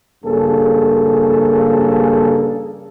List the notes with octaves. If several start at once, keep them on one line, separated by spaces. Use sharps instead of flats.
A#1 G2 C#3 A#3 G#4 A4